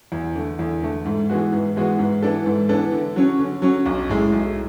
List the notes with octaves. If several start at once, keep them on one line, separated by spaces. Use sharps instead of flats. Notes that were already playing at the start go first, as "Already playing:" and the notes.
E2
D3 A3
E2
D3 A3
G#2
E3 G#3 B3 F#4
G#2
E3 G#3 B3 F#4
G#2
E3 B3 D4 A4
G#2
E3 B3 D4 A4
D3
F#3 C#4
D3
F#3 C#4
B1
A2 G#3
B1